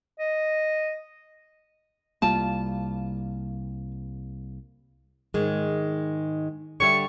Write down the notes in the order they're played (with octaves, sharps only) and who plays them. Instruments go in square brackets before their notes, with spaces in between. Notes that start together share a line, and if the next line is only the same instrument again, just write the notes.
[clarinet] D#5
[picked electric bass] C2 G3 A#3 [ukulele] F4 A5
[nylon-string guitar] G#2 D#3 G#3
[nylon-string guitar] D3 G3 E5 [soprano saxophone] C#6